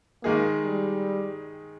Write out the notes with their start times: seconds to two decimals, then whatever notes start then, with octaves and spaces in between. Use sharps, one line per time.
0.24 D#3 G#3 A#3 D#4 G#4
0.64 G3